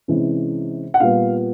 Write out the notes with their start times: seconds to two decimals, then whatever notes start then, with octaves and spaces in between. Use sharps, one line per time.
0.08 C3 E3 G#3 C#4
0.94 F#5
1.00 A#2 G3 B3 F5